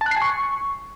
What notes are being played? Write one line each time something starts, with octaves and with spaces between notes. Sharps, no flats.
A5
F#6
C7
G#5
C#6